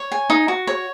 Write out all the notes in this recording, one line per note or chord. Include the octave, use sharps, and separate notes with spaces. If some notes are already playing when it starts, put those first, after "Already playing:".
Already playing: C#5
G#5
D#4
F#4
C#5